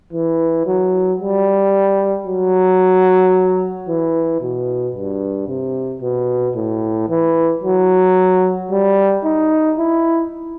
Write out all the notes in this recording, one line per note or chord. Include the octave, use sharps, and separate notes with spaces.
E3
F#3
G3
F#3
E3
B2
G2
C3
B2
A2
E3
F#3
G3
D#4
E4